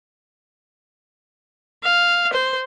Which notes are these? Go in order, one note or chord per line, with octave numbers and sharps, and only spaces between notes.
F5
C5